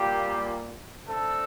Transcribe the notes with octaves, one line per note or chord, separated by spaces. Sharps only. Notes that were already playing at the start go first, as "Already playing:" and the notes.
Already playing: A#2 G3 A#3 G4
D3 A3 C4 A4